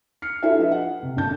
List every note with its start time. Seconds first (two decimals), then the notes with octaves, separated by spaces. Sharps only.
0.22 F6 C7 C#7
0.43 D4 E4 F#4 G4 A4 E5
0.59 F3 E4 A4 B4 D#5 E5
0.72 F#5
1.03 C3
1.16 G#1 D3 D4 A5 G6